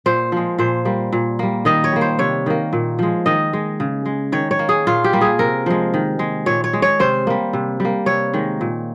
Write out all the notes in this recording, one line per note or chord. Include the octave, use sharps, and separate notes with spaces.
A#2 C5
F3 G#3
A#2 C5
G3 A#3
A#2
G3 A#3
D#3 D#5
C#5
G3 A#3
C5
C3 C#5
D#3 A#3
A#2
F3 G#3
D#3 D#5
G#3
C#3
G#3
D#3 C#5
C#5
A#3
G#4
A#2 F4
G4
G3 A#3
G#4
C3 A#4
F3 G#3
D#3
G#3
A#2 C#5
C#5
G#3
C#5
C3 C5
G3 A#3
C3
G3 A#3
C3 C#5
D#3 G#3
A#2